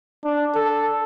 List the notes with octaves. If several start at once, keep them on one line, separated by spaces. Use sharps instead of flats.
D4
A4